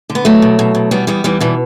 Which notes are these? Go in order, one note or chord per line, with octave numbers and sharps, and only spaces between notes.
D3
B3
E2 F#3 A3
B2
B2
B2
E2 G3 B3
E2 G3 B3
E2 E3 G3
B2 E3 G3